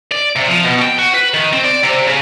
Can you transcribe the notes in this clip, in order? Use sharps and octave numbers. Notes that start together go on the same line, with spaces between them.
D5
C3
F3
B2
G5
F#4
B4
D#3
C4
D5
C3
C#3